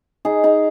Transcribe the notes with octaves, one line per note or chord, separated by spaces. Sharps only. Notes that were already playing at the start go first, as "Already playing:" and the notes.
D#4 G#4
D#4 G#4